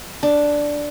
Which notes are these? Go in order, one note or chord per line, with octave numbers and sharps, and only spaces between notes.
D4